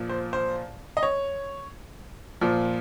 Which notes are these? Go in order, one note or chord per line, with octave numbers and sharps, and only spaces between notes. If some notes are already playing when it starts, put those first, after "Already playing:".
Already playing: A#2 F3
C5
C5
D#5
C#5
A#2 F3